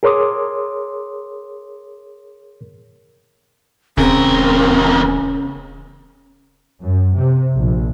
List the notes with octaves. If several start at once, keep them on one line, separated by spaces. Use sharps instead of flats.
G#4 A#4 C#5 C6 D6 D#6
D#1 E2 C#3 C4 A#4
F#2
C3
A#1